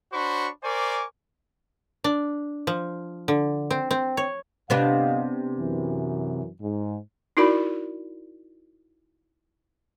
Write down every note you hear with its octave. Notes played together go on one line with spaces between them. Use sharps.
D4 F#4 C5 C#5 B5 C#6
A#4 C5 D5 G#5 C#6 D6
D4
F3
D3
C4
C4
C#5
G1 C3 B3 D4 D#5 F5
F#2 E3
G#2
D#4 E4 F#4 A#4 D5 B5